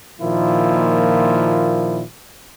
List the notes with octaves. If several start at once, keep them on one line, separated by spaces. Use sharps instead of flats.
A#2 D#3 F3 A#3 E4